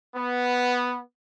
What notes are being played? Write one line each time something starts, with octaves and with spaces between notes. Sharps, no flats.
B3